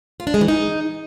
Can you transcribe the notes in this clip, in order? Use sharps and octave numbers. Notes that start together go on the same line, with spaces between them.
F4
D4
G#3
E3
D#4